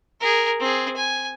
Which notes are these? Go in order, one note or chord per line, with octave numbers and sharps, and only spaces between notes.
G#4 A#4
C4 G#4
G#5